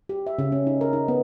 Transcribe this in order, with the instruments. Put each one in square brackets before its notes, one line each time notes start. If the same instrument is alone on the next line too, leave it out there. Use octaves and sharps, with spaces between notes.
[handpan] G4
E5
C#3
C#4
D#4
A#4
D#4
B3